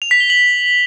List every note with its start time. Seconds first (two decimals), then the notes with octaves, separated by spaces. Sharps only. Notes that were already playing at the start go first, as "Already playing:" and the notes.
0.02 F7
0.11 B6
0.20 G7
0.30 F#7